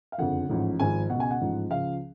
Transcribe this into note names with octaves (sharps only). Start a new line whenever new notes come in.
F5
F#1 F2 D3 F3 F#5
A1 G#2 F3
G#1 G#2 F3 G#5
C#2 B2 F#5
G#5
F#5
A1 G#2 F3
C#2 C#3 F3 F5